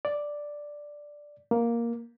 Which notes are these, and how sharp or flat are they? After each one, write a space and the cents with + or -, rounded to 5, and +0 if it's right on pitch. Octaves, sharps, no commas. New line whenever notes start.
D5 +0
A#3 +5